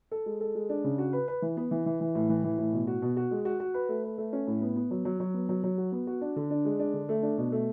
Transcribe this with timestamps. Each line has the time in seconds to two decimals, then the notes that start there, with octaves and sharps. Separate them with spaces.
0.11 A4
0.26 G#3
0.41 A4
0.55 G#3
0.69 D4
0.84 C#3
0.98 F#4
1.13 B4
1.28 B4
1.42 E3
1.57 B3
1.71 E3
1.86 E3
2.01 E3
2.15 A2
2.29 E3
2.44 E3
2.58 A2
2.73 B2
2.87 F#4
3.02 B2
3.17 F#4
3.31 G#3
3.45 F#4
3.60 F#4
3.74 B4
3.89 A3
4.04 B4
4.18 A3
4.33 C#4
4.47 A2
4.61 B3
4.76 B3
4.91 F#3
5.05 F#3
5.20 F#3
5.34 B3
5.49 F#3
5.64 F#3
5.78 F#4
5.92 B3
6.07 F#4
6.21 D4
6.36 D3
6.50 D4
6.65 G#3
6.79 D4
6.94 D3
7.09 A3
7.23 D4
7.38 B2
7.52 A3